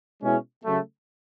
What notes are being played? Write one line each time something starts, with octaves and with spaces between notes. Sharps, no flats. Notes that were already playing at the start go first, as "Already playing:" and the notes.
B2 G#3 C#4 E4 G#4
C#3 F#3 A3